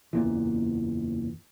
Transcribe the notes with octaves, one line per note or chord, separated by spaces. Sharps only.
F#1 E2 A#2 E3